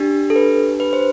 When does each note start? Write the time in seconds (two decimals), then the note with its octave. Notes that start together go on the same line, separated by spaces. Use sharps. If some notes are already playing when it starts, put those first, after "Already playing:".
Already playing: D4 G4
0.30 A4
0.36 B4
0.80 B4
0.93 C5